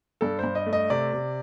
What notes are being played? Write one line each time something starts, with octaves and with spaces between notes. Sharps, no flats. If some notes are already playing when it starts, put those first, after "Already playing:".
G2 A4
G2 C5
D#5
A3
D#5
C3 D5
C3